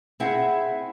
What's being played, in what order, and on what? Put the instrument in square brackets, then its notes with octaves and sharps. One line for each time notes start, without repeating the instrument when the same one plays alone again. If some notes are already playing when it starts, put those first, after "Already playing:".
[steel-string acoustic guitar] C4 E4 G#4 E5 F#5